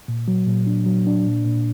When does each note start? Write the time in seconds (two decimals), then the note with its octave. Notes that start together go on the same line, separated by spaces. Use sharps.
0.08 A#2
0.28 F#3
0.47 A#2
0.67 D4
0.86 F#3
1.07 D4
1.26 A#2
1.45 A#2